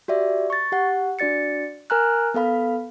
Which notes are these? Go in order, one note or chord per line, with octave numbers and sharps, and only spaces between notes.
F#4 G4 D5 E5
C#6 A6
G4 F#5
D4 F#4 D5 A6 C#7
A#4 G#5 A#5 F6 F#6
B3 A4 F5 B5